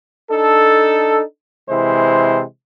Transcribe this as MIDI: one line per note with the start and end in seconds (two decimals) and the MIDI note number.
0.32 1.22 62
0.32 1.22 63
0.32 1.22 69
1.70 2.43 48
1.70 2.43 52
1.70 2.43 56
1.70 2.43 64
1.70 2.43 72